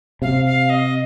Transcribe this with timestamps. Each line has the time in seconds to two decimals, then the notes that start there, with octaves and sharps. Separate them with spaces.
0.22 C3 F5
0.46 F5
0.70 D#5